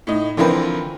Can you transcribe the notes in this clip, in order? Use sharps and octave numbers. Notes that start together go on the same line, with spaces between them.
A2 D#4
D3 E3 F3 C4 A#4 B4